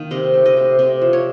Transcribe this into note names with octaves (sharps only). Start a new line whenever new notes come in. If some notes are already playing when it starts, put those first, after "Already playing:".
Already playing: D#3 A#3
C3 D#5
A3
D#5
C3
C3 D#5
F3
C#5